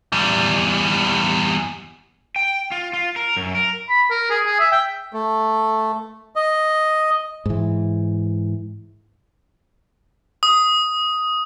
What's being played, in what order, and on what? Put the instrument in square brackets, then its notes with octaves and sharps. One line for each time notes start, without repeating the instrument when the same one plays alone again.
[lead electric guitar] E2 G3
[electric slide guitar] G5
F4
F4
A#4
F#2
A#4
[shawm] B5
A#4
G#4
G#4
E5
G5
[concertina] A3
D#5
[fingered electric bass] G#2 E3
[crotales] D#6